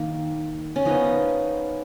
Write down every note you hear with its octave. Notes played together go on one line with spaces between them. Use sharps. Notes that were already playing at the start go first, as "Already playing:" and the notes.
Already playing: D#3 A#3
C#4
F3 B3 D#4